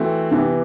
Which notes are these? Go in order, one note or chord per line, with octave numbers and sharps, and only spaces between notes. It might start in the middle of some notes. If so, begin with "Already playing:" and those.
Already playing: E3 A3 C4 F#4
C3 E3 B3